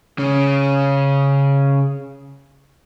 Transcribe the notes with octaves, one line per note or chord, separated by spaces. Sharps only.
C#3 C#4